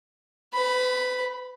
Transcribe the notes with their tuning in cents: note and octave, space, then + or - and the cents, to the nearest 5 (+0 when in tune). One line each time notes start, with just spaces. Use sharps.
B4 +40 B5 +0